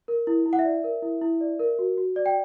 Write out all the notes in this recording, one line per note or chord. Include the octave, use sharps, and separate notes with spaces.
A#4
E4
E4
F#5
E5
D5
A#4
E4
E4
D5
A#4
F#4
F#4
D5
G5